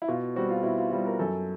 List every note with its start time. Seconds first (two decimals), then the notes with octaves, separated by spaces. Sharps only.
0.02 E4
0.08 B2 F4
0.36 G3 C4 F#4
0.50 F4
0.63 B2 E4
0.78 F4
0.91 G3 C4 F4
1.06 A#4
1.19 F#2 A4